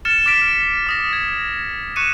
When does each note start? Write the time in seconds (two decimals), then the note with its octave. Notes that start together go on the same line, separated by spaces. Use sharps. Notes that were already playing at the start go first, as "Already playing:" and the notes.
0.05 F6 A6 C#7 E7
0.26 D6 F6 A6 B6 D7 E7
0.41 F6 D7
0.87 D6 D#6 A#6
1.13 G#6
1.96 C#6 F#6 C#7 D#7 E7